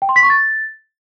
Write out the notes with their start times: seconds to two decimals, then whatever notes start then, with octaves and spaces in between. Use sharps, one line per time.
0.02 G5
0.09 C6
0.16 B6
0.23 C#6
0.30 A6